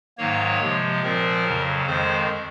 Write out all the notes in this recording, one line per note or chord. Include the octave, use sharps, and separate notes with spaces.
G#2 D#3 F#3 A#3 C#5
C3 F3 G#3
A#2 F3 C4 A#4
F2 C#3 F#3
F2 D#3 G#3 C5